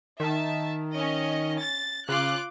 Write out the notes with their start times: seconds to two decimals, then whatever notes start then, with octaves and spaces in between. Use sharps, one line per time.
0.20 D#3 E5 A5
0.96 C#4 D#5
1.62 A6
2.09 C#3 F4 D6 F#6